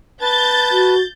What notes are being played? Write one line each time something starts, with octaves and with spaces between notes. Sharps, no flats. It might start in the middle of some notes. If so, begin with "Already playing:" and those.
B4 A5 G6 A6
F#4